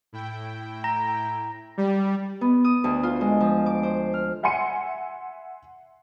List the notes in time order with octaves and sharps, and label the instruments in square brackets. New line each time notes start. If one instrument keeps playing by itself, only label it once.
[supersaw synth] A2 E4 G5
[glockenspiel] A#5 A#6
[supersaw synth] G3
[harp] B3
D#6
D2
F4
G#3
F3
D6
C5
F6
[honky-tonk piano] E5 F#5 G#5 C6 C#7 D#7